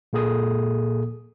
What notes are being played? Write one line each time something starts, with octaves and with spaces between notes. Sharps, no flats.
A#2 A#3 G#4 A4 D#6